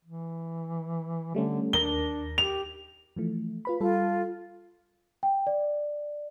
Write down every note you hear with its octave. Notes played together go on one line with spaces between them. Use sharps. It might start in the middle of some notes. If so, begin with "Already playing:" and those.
E3
D3 G3 A3 C#4
D#2 D4 A#4 A#6 G7
G4 F7
E3 F3 A3
F4 B4 B5
G3 F4 A4
G5
D5